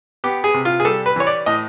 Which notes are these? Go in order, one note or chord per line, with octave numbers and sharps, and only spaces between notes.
B3 G4
G#4
C3
F4
G#4
G3 A4
B4
E3 C#5
D5
A2 D#5